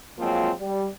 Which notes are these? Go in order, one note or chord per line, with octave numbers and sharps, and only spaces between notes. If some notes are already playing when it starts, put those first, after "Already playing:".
F3 F#3 G#3 A#3 C4 F4
G3